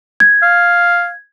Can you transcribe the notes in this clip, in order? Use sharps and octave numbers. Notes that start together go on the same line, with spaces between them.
G#6
F5